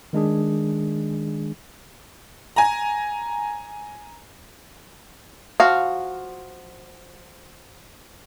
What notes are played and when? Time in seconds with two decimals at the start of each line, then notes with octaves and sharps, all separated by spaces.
0.13 D#3 G#3 D4 G#4
2.56 G#5 A#5
5.60 F3 F#4 F5